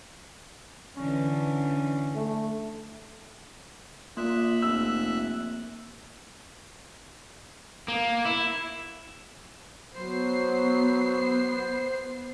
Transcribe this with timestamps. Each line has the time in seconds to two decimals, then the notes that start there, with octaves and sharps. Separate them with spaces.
0.96 D3 E3 C#4
2.15 A3
4.17 A#2 A#3 E5 F#6
4.62 F1 E6
7.88 A#3
8.25 E4
9.95 F#3 B3 C5 C7